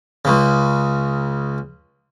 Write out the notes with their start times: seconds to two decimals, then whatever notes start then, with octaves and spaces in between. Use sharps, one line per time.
0.25 C#2 C#3